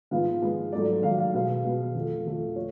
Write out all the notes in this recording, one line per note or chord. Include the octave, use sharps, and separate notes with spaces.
G#2 F3 G#3 B3 F5
G#2 F3 G#3 B3
G#2 F#3 A3 D5
G#2 F#3 A3 F5
F5
B2 G#3 B3 F5
B2 G#3 B3
F2 F3 A3
F2 F3 A3
A3 C#5